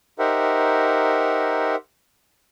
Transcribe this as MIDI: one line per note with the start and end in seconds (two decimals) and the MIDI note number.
0.19 1.75 63
0.19 1.75 67
0.19 1.75 70
0.19 1.75 72
0.19 1.75 76
0.19 1.75 78